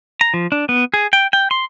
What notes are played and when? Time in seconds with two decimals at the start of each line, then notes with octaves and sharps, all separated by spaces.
0.21 A#5
0.34 F3
0.52 D4
0.69 B3
0.94 G#4
1.13 G5
1.33 G5
1.51 C6